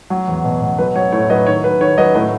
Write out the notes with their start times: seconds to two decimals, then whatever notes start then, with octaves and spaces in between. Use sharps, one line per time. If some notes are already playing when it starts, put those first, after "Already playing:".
0.10 F#3
0.28 E2
0.44 B2
0.62 B2
0.78 F#3 B4
0.95 F#3 C#5
1.12 A2 C#5
1.29 F#3 B4 D#5
1.47 D#3 C#5
1.64 F#3 B4
1.81 D#3 C#5
1.98 F#3 B4 D#5
2.14 A2 B4 D#5